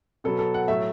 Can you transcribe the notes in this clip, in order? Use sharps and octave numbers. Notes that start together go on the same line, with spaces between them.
B2 F#3 B3 A4
A4
F#5
A2 F#3 A3 E5